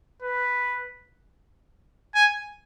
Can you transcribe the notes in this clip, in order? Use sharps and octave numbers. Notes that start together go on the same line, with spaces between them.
B4
G#5